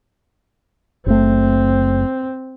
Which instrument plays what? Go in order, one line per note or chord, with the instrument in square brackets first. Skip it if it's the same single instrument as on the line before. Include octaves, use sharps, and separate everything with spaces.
[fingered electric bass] F#1 A3 [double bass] C4